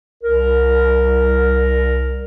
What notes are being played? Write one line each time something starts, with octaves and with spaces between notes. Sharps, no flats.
C2 A#4